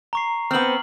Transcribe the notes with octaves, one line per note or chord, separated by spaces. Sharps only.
A#5 C#6 C7
B3 C4 F6 F#7